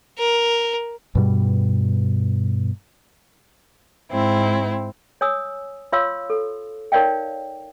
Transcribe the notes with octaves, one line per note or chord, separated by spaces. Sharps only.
A#4
G2 B2 G3
G#2 C4 E4
C#5 G#5 D#6 E6
F4 C#5 F5 C6 E6
A4
D#4 A#4 C#5 D5 F5 G5